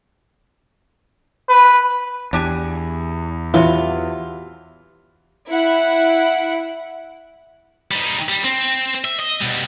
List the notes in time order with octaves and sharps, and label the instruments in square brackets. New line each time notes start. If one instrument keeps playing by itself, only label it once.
[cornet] B4
[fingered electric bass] E2 [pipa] D4 G4 G#5
[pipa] C3 F#3 F4 [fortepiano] E3
[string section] E4 F#5
[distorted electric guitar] G3 D#4
G3
C4
E5
D#5
B2 G3